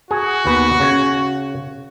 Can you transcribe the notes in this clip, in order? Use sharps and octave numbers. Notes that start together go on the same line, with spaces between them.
F#4 G#4
D#2 B3 B4
C#3 C#5